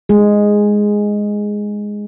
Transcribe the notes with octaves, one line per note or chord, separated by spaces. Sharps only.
G#3 G#4